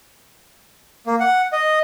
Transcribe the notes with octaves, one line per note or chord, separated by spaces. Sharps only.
A#3
F#5
D#5